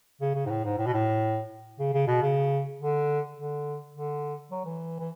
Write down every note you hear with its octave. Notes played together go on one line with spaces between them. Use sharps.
C#3
C#3
G#2
A2
G#2
A2
B2
A2
C#3
C#3
B2
C#3
D3
D3
D3
F#3
E3
E3